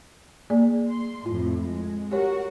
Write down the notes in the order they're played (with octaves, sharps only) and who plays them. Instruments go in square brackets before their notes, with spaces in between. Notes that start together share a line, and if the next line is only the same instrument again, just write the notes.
[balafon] A#3 G#4 D5
[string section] C6
[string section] F2 A2 [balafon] F4
[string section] G#3
[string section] F#4 A#4 F#5 [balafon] G4 C#5